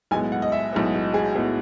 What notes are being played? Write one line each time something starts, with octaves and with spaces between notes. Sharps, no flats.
B1 A2 G#3 B3 G#5
F#5
D#5
E5
B1 A2 G#3 B3
F#4
G#4
A2 G#3 B3 G#4